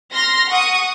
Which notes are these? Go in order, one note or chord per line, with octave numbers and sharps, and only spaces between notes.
C6 F6 A#6
F#5 C#6 D#6